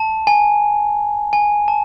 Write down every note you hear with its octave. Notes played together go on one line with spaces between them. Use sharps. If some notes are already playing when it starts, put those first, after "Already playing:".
Already playing: A5
G#5
G#5
A5